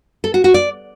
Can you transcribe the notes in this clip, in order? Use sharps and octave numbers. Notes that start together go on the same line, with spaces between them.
A4
F#4
F#4
D5